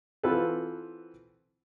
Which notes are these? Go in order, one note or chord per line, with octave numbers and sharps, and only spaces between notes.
E3 C4 F4 F#4 A4 B4